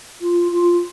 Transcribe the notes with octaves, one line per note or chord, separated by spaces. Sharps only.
F4
F4